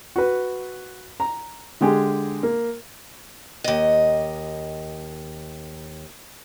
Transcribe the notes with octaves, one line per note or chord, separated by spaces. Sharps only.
F#4 B4
A#5
D3 G#3 G4 G#4
A#3
D#2 D#5